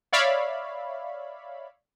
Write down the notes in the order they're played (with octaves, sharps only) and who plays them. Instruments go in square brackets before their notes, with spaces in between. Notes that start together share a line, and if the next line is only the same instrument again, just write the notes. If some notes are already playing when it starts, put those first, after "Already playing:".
[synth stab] C#5 D5 E5 F5 B5